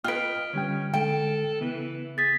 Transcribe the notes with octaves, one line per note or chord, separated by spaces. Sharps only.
F4 B4 D#5 G5 F6 D7
D3 G3 C#4 G5
D3 G#3 A4 G5
C#3 E3 B3
G#4 A6 B6